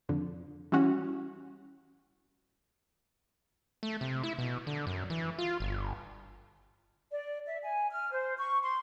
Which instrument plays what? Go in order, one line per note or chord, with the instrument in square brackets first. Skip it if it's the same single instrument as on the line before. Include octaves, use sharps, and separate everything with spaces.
[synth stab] F2 D3
E3 G3 C#4 F#4
[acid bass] A3
C3
E4
B2
D3
F#2
E3
F4
G1
[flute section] D5
E5
G#5
F6
C5
C#6
C6